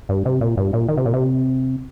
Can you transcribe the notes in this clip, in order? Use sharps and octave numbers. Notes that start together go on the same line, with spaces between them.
G2
C3
A#2
G2
A#2
D#3
C3
A#2
C3